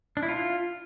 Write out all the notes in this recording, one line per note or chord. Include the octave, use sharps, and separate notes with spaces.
D4
E4
F4